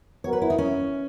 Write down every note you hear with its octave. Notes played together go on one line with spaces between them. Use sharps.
F#3 B3 F#4 A#4 C#5
B4
E4
D#4
C#4